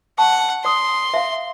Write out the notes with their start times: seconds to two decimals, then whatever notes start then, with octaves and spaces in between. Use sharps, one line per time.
0.18 F#5 A5 C#6
0.65 D5 C6 D#6
1.14 E5 F5